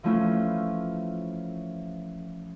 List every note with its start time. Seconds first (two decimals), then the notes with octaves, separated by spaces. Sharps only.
0.03 E3 F3 A3 C#4 E4 F4